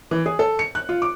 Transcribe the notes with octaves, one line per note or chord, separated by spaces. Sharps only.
E3
G#4
A4
C#7
F#6
F4
D6